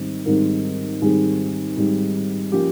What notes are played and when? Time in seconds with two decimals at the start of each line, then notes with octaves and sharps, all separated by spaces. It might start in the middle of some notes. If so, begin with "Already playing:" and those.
Already playing: G#2 D#3 G3 C4
0.26 G#2 D#3 G3 C4 A#4
1.01 G#2 D#3 G3 C4 G#4
1.77 G#2 D#3 G3 C4
2.52 F3 A#3 C#4 G4